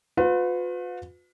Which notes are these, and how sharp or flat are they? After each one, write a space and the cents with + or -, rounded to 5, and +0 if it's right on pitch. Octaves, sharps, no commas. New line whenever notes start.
F4 +45 B4 +30